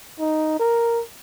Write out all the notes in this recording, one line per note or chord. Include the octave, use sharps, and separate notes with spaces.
D#4
A#4